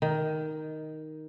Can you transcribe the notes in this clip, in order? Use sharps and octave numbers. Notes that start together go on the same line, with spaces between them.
D#3